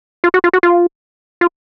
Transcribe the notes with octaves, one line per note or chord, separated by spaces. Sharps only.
F4
F#4
F4
F#4
F4
F4